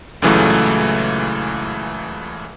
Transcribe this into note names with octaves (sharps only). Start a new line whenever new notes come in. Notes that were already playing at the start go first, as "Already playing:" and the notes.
C#2 A#2 C#3 E3 F#3 A3